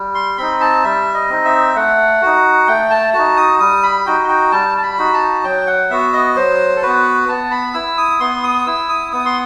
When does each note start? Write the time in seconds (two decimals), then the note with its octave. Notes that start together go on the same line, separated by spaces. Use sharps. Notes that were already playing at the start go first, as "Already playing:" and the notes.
Already playing: G3
0.15 C6
0.38 C4 D#4 B5
0.61 A5
0.84 G3 E5
1.14 D#5
1.29 C4 D#4
1.45 E5
1.76 A3 F#5
2.22 D#4 F#4
2.68 A3 G5
2.91 A5
3.13 D#4 F#4 A5
3.37 D#6
3.60 G3 D#6
3.83 B5
4.06 D#4 F#4 G5
4.29 G5
4.52 G3 A5
4.78 A5
4.83 B5
4.98 D#4 F#4
5.13 A5
5.44 F#3 G5
5.67 F#5
5.90 B3 F#4 E5
6.13 D#5
6.36 F#3 C5
6.76 A4
6.82 B3 F#4 B4
7.29 B3 A5
7.51 B5
7.74 E4 E6
7.97 D#6
8.20 B3 C6
8.44 D#6
8.66 E4 E6
8.89 D#6
9.12 B3 D#6
9.25 C6